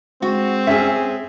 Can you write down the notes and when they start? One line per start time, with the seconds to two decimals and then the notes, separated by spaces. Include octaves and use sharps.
0.22 G#3 C4 F#4
0.67 C#4 G#4 E5